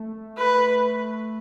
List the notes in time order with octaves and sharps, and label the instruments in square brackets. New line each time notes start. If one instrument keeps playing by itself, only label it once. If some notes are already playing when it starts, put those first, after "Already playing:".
Already playing: [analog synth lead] A3
[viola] B4